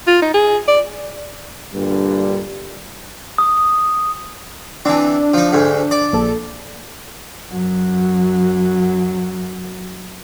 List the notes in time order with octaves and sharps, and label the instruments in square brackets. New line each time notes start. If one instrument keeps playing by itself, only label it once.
[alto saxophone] F4
D#4
G#4
D5
[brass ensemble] G2 A#2 D3 G3
[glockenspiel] D#6
[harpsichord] E3 C4 [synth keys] D4
[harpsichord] F3 D#4
D2 G#2
D5
[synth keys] A#1 A4
[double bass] F#2 F#3